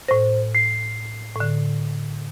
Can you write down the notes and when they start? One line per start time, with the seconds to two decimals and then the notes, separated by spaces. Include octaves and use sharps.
0.08 A2 C5 A#6
0.55 C7
1.36 A2 D3